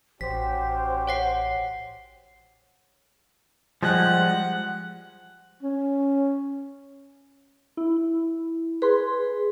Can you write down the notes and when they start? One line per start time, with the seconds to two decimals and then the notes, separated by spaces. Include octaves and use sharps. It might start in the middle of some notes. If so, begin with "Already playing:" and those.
0.21 A1 C#4 F#4 G4 C5 B6
1.07 C#5 F#5 C7
3.83 F3 G3 G#3 F#5
5.63 C#4
7.77 E4
8.82 G#4 B4 C6